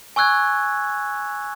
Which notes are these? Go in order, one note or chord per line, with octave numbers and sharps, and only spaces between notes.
G#5 C#6 E6 F#6 G#6